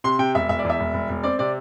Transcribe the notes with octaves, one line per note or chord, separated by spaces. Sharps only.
C3 C6
C3 G5
E1 E5
E1 E5
D5
E2
E5
E1
E1
E1
C4 D5
C3 D5